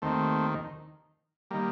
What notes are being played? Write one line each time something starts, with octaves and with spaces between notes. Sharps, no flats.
D#2 D#3 A3 C4
D#3 G3 A#3